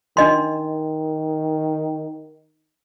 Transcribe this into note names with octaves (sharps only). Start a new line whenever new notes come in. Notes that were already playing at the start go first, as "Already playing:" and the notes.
D#3 D4 D#5 C6